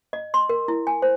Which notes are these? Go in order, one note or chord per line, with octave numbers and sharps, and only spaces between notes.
D#5
C6
A#4
E4
G#5
C5